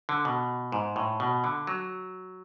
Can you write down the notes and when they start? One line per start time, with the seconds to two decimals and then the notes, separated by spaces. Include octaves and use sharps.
0.09 D3
0.25 B2
0.72 G#2
0.96 A2
1.20 B2
1.44 D3
1.67 F#3